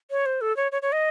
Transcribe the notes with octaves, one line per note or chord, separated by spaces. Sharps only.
C#5
C5
A4
C#5
C#5
C#5
D#5